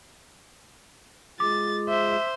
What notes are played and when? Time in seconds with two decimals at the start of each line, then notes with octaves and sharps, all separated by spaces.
1.40 G#3 F4 G#4 D6 A6
1.89 C5 E5